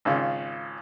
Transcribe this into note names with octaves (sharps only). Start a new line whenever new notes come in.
G#1 C#3 F4